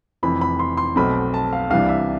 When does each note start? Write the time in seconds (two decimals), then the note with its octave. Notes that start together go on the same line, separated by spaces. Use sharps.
0.23 F1 F2 E3 B5
0.41 B5
0.59 C6
0.77 C6
0.96 B1 B2 A3 C4 B5
1.34 A5
1.53 F5
1.70 C2 C3 E3 G3 D4 F5
1.89 E5